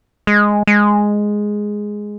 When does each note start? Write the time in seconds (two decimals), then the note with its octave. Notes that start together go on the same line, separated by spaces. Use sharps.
0.27 G#3
0.67 G#3